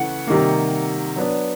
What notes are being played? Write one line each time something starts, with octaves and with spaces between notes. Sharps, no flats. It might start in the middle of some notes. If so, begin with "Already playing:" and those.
Already playing: C#3 E3 A3 F#5
C3 D#3 G3 A#3
F#3 B3 D4